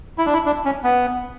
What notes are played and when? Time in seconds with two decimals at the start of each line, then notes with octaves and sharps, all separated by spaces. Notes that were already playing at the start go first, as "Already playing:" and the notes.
0.18 E4
0.26 D4
0.33 E4
0.46 D4
0.65 C#4
0.84 B3